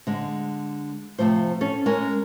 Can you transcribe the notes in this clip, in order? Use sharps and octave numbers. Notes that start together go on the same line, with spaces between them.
D3 G#3
C3 F3 A3 C5
C#4 A4
G#3 C#4 A#4